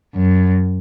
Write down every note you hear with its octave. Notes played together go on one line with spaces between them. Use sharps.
F#2